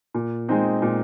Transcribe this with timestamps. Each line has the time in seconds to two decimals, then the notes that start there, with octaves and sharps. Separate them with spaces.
0.14 A#2
0.49 G#3 C4 D#4
0.82 A#2